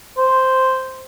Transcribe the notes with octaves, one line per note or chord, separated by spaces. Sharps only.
C5